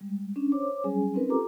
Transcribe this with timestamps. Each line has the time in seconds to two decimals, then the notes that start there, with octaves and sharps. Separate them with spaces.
0.01 G3 G#3
0.36 C#4 D4
0.52 C5 C#5 D6
0.84 F#3 G3 C#4 G#4 G#5
1.14 C4 C#4 D#4 A#4 B4
1.29 F4 G4 A4 A#5 D6